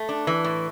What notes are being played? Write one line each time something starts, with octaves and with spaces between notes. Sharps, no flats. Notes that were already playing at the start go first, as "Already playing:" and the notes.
Already playing: A3
D4
E3
A2